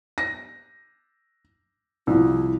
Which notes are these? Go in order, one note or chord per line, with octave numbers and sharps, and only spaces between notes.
A#6
C2 F3 E4